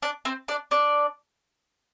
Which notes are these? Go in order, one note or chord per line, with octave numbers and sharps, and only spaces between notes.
D4 D5
C4 C5
D4 D5
D4 D5